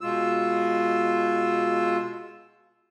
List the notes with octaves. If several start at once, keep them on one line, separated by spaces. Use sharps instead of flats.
B2 G#3 F4 E6